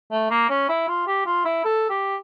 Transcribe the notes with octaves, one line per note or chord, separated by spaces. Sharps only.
A3
A#3
C#4
E4
F4
G4
F4
E4
A4
G4